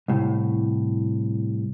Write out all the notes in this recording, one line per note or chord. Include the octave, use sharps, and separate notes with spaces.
C2 A2